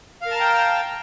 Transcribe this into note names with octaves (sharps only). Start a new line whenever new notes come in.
A#4 F5 G5 A5 A#5